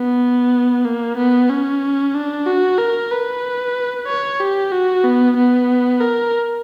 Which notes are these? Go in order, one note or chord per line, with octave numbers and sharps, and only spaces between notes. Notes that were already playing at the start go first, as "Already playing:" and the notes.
Already playing: B3
A#3
B3
C#4
D4
F#4
A#4
B4
C#5
G4
F#4
B3
B3
A#4